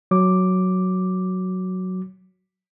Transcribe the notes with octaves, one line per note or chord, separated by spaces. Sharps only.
F#3 D6